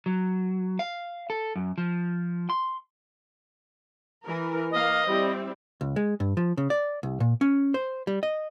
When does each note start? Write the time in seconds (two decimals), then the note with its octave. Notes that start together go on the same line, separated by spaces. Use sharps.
0.06 F#3
0.79 F5
1.30 A4
1.56 F#2
1.78 F3
2.50 C6
4.25 E3 A#4
4.71 A#3 D#5 F5
5.06 G3 C4 E4
5.81 C#2
5.96 G#3
6.20 G2
6.37 F3
6.57 C#3
6.70 D5
7.03 C2
7.20 A#2
7.41 C#4
7.74 C5
8.07 G3
8.23 D#5